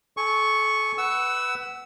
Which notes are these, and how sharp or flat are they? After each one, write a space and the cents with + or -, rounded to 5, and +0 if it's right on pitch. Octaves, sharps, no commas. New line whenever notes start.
A4 -30 G#5 +0 C#6 +0
B4 +0 F#5 +20 E6 -10